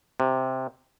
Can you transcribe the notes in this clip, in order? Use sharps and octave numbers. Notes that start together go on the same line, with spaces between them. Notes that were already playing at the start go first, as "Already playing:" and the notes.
C3